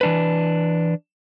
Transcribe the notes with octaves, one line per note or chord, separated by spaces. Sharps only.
E3 D4 B4